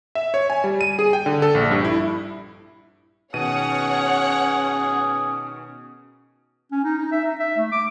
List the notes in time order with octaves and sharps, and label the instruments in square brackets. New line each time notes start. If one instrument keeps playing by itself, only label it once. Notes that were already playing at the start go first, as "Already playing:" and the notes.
[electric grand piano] E5
C#5
G#5
G3
D#7
G#4
G5
D3
A4
A#1
G2
E4
[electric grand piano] B2 D#3 D#7 [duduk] C#4 [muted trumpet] G#4 [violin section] C#5 F#5
[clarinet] C#4
D#4
D#4
E5
D#4
E5
A3
D6